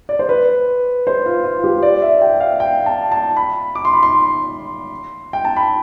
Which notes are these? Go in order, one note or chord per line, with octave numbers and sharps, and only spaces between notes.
D5
C5
B4
C5
F4
F4
G4
D5
E5
G5
F5
G5
A5
A5
B5
D6
C6
B5
C6
G5
A5
B5